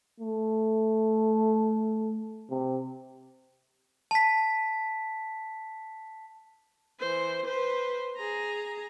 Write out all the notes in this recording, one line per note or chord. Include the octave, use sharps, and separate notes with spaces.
A3
C3
A5 B6
E3 C5
B4 C5
G#4 A#5